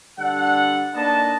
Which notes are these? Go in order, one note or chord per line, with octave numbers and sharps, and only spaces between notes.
D3 G3 D4 A4 F#5
A#3 D4 D#4 B4 D#5 A5